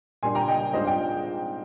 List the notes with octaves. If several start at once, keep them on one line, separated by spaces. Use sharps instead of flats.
A#2 G3 D4 G#5 C6
G5 A#5
D#5 G5
G#2 G3 D4 F4 C5 D#5
D#5 G5